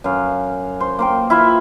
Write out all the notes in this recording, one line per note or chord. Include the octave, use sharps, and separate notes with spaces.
F#2 F5
C5
A#3 C5 G5
E4 F4 E5 F5